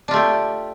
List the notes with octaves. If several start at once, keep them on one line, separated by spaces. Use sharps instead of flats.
A3 D4 F4 G4